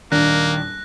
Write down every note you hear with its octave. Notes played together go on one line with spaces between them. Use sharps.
D#1 D#3 A#3 D4 F#6 A#6